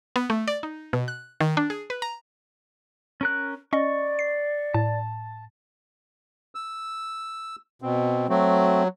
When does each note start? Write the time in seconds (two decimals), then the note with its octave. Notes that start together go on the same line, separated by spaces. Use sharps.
0.16 B3
0.30 A3
0.48 D5
0.63 D#4
0.93 B2
1.08 F#6
1.41 D#3
1.57 D4
1.70 G#4
1.90 B4
2.02 A#5
3.21 C#4 A#4 F#6
3.73 C#4 D5 D#5 C#6
4.19 C7
4.74 A2 A5
6.55 E6
7.82 B2 C4
8.29 F#3 A3 C4 F#4